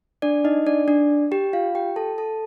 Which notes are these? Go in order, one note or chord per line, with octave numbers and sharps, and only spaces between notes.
D4 D5
D#4 D#5
D4 D5
D4 D5
G4 G5
F4 F5
G4 G5
A4 A5
A4 A5